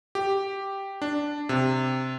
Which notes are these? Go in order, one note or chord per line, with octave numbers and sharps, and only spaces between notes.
G4
D4
C3